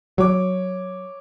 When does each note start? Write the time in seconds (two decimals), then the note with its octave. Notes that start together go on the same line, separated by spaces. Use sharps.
0.18 F#3 C#5 D6